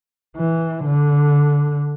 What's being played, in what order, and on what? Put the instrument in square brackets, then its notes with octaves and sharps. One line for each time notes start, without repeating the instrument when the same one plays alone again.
[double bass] E3
D3